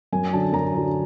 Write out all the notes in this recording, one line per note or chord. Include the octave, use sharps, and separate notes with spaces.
F#2 G#5
D3 F#3 A5
F#2 A#5
D3 F#3